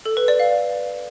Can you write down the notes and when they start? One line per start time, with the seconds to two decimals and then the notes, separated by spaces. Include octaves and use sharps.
0.06 A4
0.17 B4
0.28 D5
0.39 F5